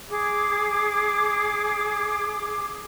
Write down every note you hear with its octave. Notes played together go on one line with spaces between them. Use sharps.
G#4 D6